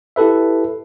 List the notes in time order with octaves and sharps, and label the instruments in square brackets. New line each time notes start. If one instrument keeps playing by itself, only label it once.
[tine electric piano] E4 G4 A4 B4 E5